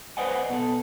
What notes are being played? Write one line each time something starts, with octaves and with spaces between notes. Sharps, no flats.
B4 C5 D5 D#5 F#5 G#5
B2 A4